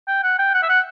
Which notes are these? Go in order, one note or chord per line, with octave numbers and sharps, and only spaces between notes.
G5
F#5
G5
F#5
E5
F#5